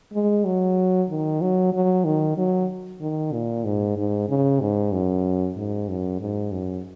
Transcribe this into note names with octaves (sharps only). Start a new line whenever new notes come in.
G#3
F#3
D#3
F#3
F#3
D#3
F#3
D#3
A#2
G#2
G#2
C#3
G#2
F#2
G#2
F#2
G#2
F#2